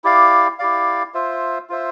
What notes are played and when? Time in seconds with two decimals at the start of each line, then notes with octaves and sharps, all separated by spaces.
0.04 E4 G4 D5 F5
0.59 E4 G4 D5 F5
1.14 F4 C5 E5
1.69 F4 C5 E5